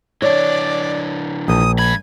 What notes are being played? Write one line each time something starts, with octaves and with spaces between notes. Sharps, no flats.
E3 D4 C#5 D5
A#1 D#6
G2 B5 G#6